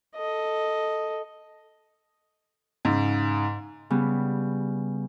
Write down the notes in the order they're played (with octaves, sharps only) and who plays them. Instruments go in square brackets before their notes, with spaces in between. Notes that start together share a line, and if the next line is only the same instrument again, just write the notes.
[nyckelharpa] A4 D#5
[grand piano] G#2 C#3
[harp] C#3 G3 B3